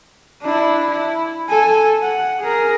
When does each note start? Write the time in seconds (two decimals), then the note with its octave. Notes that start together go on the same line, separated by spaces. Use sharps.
0.42 D4 E4
0.90 E4
1.49 A4 G#5
2.02 F#5
2.40 G#4 A#4